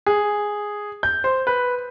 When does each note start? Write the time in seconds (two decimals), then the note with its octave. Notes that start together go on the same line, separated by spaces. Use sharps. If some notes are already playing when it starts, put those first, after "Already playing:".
0.06 G#4
1.03 G6
1.24 C5
1.47 B4